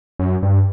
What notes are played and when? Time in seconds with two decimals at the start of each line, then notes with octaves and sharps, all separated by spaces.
0.19 F#2
0.43 G2